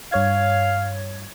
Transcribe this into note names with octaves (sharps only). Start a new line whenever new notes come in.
G2 C#5 F5 G#6